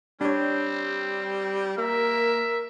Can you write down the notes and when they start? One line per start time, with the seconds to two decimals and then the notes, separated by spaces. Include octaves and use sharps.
0.21 G3 C4 D4 C#5
1.78 A#3 A#4 E5